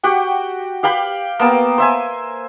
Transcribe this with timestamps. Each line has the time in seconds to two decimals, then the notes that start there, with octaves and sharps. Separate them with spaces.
0.03 F#4 G4 F#5 G5
0.83 G4 F5 G5 B5
1.39 A#3 B3 A5 E6
1.78 C5 E5 G#5